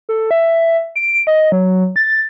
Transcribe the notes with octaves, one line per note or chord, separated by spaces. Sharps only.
A4
E5
D7
D#5
F#3
A6